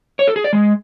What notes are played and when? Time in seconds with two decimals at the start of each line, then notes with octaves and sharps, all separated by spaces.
0.19 C#5
0.27 A4
0.36 G#4
0.44 D5
0.53 G#3